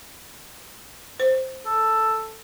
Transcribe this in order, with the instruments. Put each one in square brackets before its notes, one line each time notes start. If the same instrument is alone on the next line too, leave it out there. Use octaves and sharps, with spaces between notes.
[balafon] C5
[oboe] A4